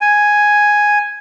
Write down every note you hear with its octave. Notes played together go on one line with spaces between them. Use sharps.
G#5